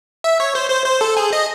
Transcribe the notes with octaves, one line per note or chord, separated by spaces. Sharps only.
E5
C#5
C5
C5
C5
A4
G#4
D#5